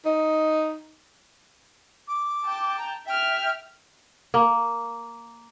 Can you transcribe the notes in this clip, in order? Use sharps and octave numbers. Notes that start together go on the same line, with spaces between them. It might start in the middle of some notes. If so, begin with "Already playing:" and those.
D#4
D6
G5 A5
A#5
E5 G5 F6
A#3